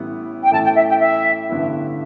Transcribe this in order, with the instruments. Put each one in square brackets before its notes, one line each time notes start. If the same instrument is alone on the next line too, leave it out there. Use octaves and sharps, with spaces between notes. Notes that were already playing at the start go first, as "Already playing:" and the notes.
Already playing: [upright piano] A1 A2 G3 B3 E4
[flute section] G5
[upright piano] A1 A2 A3 E4 [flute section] A5
[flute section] G5
E5
G5
E5
[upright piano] A1 G2 D3 B3 E4